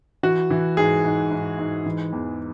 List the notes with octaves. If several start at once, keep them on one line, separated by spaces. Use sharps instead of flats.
E3 F#4
E3
G#2 G#4
G#2
G#2
G#2
E3
E2